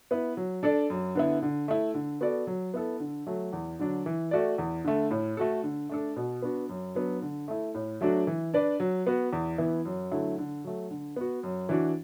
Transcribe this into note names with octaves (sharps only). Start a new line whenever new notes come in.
B3 E4 B4
F#3
D4 A4 D5
F#2
D3 B3 E4
D3
A3 E4
D3
B3 F#4 A4 D5
F#3
B3 E4 A4
D3
F#3 A3
E2
D3 F#3 D4
E3
A3 F#4 D5
E2
D3 A3
A2
A3 F#4 A4
D3
A3 D4 A4
B2
B3 D4 F#4
F#2
F#3 B3 D4
D3
A3 E4
A2
F#3 A3 D4 F#4
E3
D4 B4 D5
F#3
B3 F#4
E2
E3 B3 E4
F#2
D3 F#3 A3 E4
D3
F#3 A3
D3
B3 F#4
F#2
E3 D4 F#4